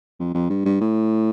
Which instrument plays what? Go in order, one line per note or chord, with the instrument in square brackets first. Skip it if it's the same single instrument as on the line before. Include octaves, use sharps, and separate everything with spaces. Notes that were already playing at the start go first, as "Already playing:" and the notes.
[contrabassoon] F2
F2
G2
G2
A2